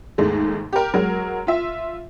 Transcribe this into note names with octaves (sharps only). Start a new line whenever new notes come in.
D#2 G#2 G#3 A3
G4 A#4
F#3 G#3 F#4 A#4
F4 E5